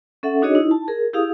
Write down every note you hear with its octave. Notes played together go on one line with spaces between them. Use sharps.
C#4 A4 E5 F#5
D4 D#4 F#4 G#4 C#5 D#5
D#4 E4
A5
G#4 A#4
E4 G4 G#4 F5 D#6